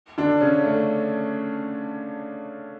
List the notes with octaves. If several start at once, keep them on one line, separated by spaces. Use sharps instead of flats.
D3 D4
C#3 C#4
A3